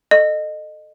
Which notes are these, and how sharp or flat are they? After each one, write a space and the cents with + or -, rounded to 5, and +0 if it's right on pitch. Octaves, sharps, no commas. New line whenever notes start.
A4 +0 D#5 -25